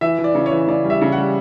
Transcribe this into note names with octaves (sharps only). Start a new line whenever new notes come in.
E3 E5
E3
D5
C#3
C#5
E3
C#3 D5
G3
E5
C#3
F#5
G3